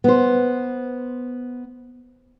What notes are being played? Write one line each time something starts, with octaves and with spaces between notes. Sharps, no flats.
B3 C5